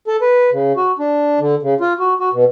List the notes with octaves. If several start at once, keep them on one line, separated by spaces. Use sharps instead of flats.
A4
B4
C#3
F#4
D4
D3
C#3
F4
F#4
F#4
B2